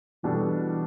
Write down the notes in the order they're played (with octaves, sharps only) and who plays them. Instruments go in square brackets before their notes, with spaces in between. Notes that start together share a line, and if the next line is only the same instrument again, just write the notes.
[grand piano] B2 G3 D4 A4 [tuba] E3